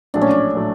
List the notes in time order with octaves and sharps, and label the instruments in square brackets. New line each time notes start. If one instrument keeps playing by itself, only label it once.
[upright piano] A#1 A2 F#3 A3 [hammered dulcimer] D4
[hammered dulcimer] C#4
D4
[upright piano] A2 F#3 A3